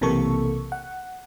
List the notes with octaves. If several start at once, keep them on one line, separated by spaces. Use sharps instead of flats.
B1 C3 E3 A#3 A4 C#6
F#5